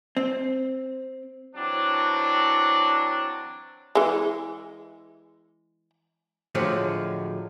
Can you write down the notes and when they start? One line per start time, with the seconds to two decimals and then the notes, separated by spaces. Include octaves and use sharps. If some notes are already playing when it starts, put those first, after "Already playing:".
0.17 C4
1.55 E3 F#3 C4 D4
3.95 E3 G#3
6.55 A2 D3 F3 F#3 G#3